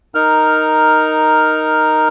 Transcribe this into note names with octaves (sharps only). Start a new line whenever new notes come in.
D#4 A#4 F6